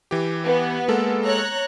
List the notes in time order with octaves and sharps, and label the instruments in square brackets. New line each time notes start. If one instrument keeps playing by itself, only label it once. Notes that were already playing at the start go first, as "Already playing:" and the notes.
[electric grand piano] E3 G4
[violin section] B3
[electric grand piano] G#3 A#3 A4
[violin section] C#5 A#5 F#6